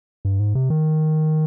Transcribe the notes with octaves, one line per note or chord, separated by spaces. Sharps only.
G2
G#2
C3
D#3